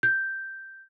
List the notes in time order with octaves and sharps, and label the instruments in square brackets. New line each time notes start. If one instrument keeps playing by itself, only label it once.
[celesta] G6